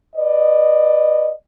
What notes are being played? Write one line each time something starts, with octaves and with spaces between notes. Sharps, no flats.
B4 D5 D#5